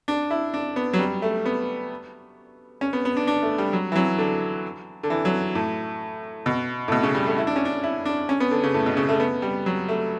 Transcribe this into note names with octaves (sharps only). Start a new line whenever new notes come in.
D4
E4
D4
B3
F#3
G3
A3
B3
C#4
B3
B3
D4
D4
A3
G3
F#3
E3
F#3
D3
D3
E3
F#3
A2
B2
A2
B2
C#3
G3
A3
E4
D4
C#4
D4
E4
D4
C#4
B3
D3
C#3
A2
B2
C#3
A3
B3
G3
F#3
A3